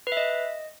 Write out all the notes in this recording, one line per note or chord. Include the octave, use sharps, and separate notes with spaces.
B4
E5
D#5